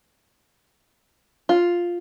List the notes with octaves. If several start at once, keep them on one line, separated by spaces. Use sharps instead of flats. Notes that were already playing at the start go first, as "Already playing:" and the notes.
F4